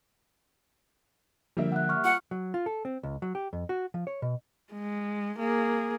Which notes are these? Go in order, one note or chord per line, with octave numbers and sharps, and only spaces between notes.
D3 F3 G3 A#3 E5
F#5 F#6
C#6 F6
F4 F#5 C#6
F#3
F4
A4
C4
C#2
F#3
G4
F2
F#4
F3
C#5
B2
G#3
A#3 G#4